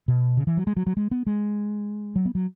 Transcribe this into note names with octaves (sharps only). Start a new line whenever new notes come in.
B2
C#3
E3
F#3
G#3
F#3
F#3
G#3
B3
G#3
F#3
B3
F#3